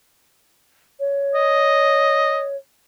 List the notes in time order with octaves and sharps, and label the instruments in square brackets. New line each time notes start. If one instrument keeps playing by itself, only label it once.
[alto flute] C#5
[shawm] D#5